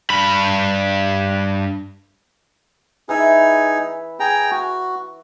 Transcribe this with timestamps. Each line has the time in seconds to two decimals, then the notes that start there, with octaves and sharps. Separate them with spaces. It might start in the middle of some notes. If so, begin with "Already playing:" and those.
0.10 G2 B5
3.09 E3 D#4 G#4 E5 B5
4.20 G#4 G5 A#5
4.51 F#4